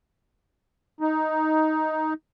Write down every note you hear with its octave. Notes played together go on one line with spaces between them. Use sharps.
D#4